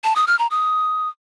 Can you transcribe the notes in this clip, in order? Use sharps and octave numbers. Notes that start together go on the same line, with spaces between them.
A5
D#6
F6
A#5
D#6